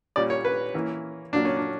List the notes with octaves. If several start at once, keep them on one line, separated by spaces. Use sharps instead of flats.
A#2 G3 C#4 D5
C#5
B4
E3 A#3 C#4
A#2 F#3 A#3 D4
C#4
D4